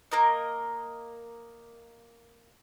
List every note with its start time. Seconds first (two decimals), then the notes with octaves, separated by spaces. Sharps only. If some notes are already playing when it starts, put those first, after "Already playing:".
0.11 A#3 A#4 D#5